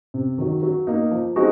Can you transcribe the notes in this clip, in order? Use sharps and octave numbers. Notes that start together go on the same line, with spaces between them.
C3
D#3 F#3
F#3
A#3 D#4
F3
G#3 C4 D#4 F#4